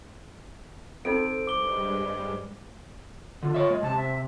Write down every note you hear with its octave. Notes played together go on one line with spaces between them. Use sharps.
C4 D#4 F4 A4 D7
G2 G3 G#3 D6 G7
D3 F4
C#5 E5
G#3
C3 A5
E5